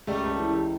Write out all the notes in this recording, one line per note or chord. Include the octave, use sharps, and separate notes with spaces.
C#2 G3 A3
C#2
E3